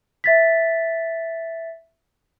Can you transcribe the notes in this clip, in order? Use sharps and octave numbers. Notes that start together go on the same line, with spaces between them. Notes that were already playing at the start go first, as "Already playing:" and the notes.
E5 A6 B6